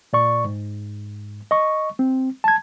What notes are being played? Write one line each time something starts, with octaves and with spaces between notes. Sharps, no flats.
A#2 D5 C#6
G#2
D#5 C#6
C4
A5 G#6